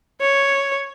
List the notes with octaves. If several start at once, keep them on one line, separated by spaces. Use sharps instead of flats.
C#5